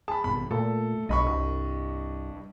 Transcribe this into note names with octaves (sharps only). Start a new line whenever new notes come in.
G#4 A5 B5
G#1 G2 B2 B5
A#2 A3 A4
B1 G2 D#5 B5 C#6
C2